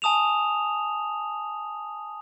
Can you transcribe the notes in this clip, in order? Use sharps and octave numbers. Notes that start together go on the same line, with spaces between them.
G#5 A5 D#6 E7 F7